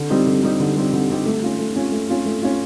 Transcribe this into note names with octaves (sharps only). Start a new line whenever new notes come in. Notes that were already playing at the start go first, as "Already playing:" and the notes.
Already playing: D3
G3 C4 D#4 G4
D3
G3 C4 D#4 G4
D3
G3 C4 D#4 G4
D3
G3 C4 D#4 G4
A3
C#4 F4
A3
C#4 F4
A3
C#4 F4
A3
C#4 F4